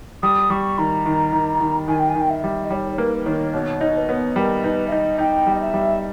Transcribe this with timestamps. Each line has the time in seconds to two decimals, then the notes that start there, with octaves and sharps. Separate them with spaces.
0.23 G3 D#6
0.50 G3 C#6
0.78 D#3 A#5
1.06 D#3
1.32 D#3
1.60 D#3
1.88 D#3 G#5
1.98 G5
2.08 G#5
2.15 D#3
2.20 G5
2.29 E5
2.44 G3
2.64 D#5
2.70 G3 C#5
2.92 C#5
2.98 A#3 B4
3.16 B4
3.26 D#3 C#5
3.53 B2 C#5
3.81 D#4 C#5
3.97 B4
4.09 B3 C#5
4.36 G3 A#4
4.64 D#4 B4
4.87 E5
4.91 D#4 D#5
5.18 D#4 G5
5.47 G3
5.54 D#5
5.61 E5
5.74 G3